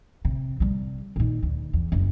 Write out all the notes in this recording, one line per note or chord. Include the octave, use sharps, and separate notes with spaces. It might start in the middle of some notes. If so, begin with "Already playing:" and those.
C3
C3 G3
A#2 D#3
D2
E2
F#1